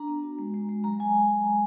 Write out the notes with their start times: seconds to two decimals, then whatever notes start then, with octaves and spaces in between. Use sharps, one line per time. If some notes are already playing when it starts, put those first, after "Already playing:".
Already playing: D4 A#5
0.08 B3
0.23 F#4
0.39 G#3
0.54 G#3
0.69 G#3
0.84 F#3 A#5
0.99 F#3 G#5